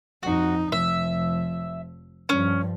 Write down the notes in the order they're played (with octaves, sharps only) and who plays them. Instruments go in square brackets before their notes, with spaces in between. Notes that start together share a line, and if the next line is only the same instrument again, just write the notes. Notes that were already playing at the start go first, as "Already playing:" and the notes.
[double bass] F2 D#4 [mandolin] F#4
[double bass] F1 F3 [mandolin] E5
[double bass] G2 F3 [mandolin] C#4